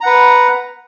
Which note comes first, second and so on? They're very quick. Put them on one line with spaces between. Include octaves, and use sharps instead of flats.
A#5 F#5 B4